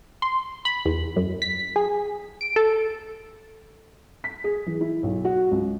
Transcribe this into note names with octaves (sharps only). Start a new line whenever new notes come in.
C6
B5
E2
F#2
B6
G#4
D7
A4
B6
G#4
E3
E4
B1
F#4
C#2